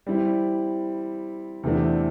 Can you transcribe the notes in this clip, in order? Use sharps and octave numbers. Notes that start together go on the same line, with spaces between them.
G3 C4 E4
E2 C3 E3 A3 D4